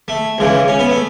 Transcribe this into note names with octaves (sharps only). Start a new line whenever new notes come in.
A3
C#2 C#3 E3
C#4
B3
A3